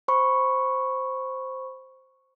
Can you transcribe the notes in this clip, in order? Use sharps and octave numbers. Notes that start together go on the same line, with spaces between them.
C5 B5 C#6